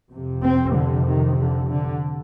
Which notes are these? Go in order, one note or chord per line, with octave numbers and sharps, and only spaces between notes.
F2 C3
C4
D3
D#3
D3
D3